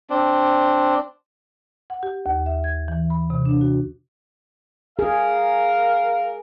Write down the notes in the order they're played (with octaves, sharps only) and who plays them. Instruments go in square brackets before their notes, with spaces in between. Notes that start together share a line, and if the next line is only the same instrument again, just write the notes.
[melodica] C4 D4
[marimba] F#5
G4
D#2
E5
G#6
E3
B5
C3
D4
F#4
[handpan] G#4 [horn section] A#4 F5